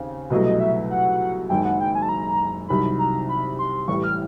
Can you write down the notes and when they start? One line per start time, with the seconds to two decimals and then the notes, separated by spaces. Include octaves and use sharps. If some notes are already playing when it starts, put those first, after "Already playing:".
Already playing: D#2 C#3 C4
0.30 C2 B2 F#3 A3 D#5
0.45 D#5
0.60 E5
0.90 F#5
1.49 F#1 F#2 D#3 G#3 G5
1.65 F#5
1.80 G5
1.95 G#5
2.02 A5
2.09 A#5
2.68 C2 C3 D#3 F#3 B5
2.99 A#5
3.29 B5
3.59 C6
3.88 A1 A2 E3 G3 C#6
4.04 F6